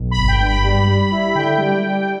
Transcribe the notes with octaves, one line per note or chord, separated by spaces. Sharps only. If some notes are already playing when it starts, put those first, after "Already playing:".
Already playing: B1
B5
G1
G5
G2
B5
G3
G3
E4
D3 G5
G3
G3